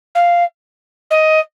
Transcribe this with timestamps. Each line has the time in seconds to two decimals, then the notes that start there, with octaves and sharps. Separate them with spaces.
0.15 F5
1.10 D#5